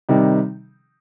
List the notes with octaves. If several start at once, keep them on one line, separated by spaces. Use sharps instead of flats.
C3 D#3 G3 D#4